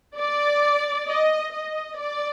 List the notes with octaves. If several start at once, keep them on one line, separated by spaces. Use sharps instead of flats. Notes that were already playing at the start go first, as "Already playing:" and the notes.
D5
D#5
D#5
D5